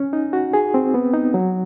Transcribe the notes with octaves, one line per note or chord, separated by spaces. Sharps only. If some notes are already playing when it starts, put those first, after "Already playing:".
Already playing: C#4
D#4
F#4
G#4
C4
B3
D#4
F#3